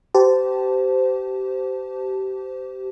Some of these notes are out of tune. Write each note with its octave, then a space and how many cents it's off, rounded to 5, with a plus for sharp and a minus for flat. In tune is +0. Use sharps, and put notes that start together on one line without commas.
G4 -25 C5 -25 A5 +0